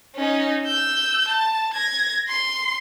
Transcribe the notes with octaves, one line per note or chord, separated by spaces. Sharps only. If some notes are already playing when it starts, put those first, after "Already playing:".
C#4 D#4
E6 G6
A5
G#6 A#6
C6